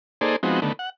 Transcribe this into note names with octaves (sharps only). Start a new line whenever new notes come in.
A#3 D#4 G#4 A4 C5 D5
F3 G#3 B3 C4 D#4 F#4
D3 D#3 A3 B3
F#5